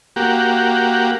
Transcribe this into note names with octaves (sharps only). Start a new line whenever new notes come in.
A#3 F#4 G4